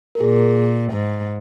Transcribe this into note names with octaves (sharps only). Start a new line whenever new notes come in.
A#4
A#2 G#4
G#2